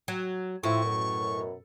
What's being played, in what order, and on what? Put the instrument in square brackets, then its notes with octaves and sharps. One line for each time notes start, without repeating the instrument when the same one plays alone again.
[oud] F#3
[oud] A2 [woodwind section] F3 C4 E4 [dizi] C#6
[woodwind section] F#2 B2